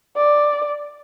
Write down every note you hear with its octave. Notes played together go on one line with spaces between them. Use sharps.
D5